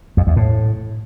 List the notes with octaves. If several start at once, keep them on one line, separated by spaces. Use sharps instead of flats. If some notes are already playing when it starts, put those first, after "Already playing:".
F2
E2
A2